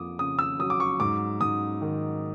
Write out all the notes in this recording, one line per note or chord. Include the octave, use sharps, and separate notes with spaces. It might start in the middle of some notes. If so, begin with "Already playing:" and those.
Already playing: F2 A#3 D6 D#6
C#3 D#6
E6
F#3 D#6
D6
C#6
G#2 D6
G#2 D#6
D#3